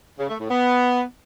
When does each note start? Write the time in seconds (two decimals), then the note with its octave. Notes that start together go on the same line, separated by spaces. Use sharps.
0.19 C#3
0.29 A3
0.39 A2
0.49 B3